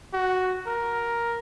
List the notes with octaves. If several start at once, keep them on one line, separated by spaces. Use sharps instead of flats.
F#4
A#4